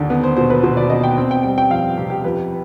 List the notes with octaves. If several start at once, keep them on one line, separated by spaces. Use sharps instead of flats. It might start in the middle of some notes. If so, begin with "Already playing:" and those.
Already playing: D#2 D3
B3
C5
B2 C5
B4
B2 C5
D5
B3 D#5
G5
C4
G5
G3 G5
G5
F2 F5
C3 G4
G4
F2 B4